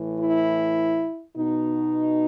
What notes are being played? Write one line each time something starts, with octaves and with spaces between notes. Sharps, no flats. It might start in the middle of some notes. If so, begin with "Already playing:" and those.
Already playing: A2 E3
E4
B2 D#4